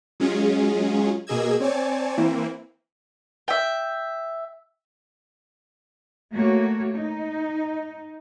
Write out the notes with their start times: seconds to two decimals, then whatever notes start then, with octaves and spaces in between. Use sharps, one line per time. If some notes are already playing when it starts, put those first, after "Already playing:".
0.20 F#3 G#3 C#4 F4 G#4
1.27 B2 A#3 G#4 D#5 E6 G#6
1.60 C4 C#5 D5 G#5 A5
2.17 E3 A#3 C4 E4
3.48 E5 G5
6.33 A3 A#3 F#4 C#5
6.94 D#4